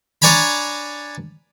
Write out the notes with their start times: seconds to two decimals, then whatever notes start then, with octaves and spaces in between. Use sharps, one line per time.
0.22 D4 C#5 D5 G#5 A#5 B5